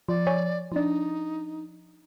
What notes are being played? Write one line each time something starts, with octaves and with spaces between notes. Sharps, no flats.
F3 D5
C#5 G#5
F3 D4 D#4